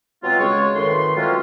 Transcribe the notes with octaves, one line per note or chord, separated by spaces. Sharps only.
B2 F#3 G#3 C4 F4
C#3 G#3 C#5
F#2 A2 D#3 B4 C6
E3 F#3 G#3 C4 C#4 F4